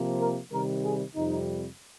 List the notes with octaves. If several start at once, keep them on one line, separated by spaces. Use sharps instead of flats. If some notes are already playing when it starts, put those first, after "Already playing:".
Already playing: C3 F3 A#3
A#4
C3 D#3 G3 A#4
G#4
F2 C3 G3 D#4